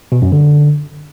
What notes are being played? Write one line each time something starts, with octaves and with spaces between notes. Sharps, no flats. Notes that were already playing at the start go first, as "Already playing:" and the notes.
B2
F#2
D3